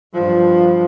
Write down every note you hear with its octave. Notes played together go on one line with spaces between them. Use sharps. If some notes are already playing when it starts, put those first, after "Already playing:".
G2 F3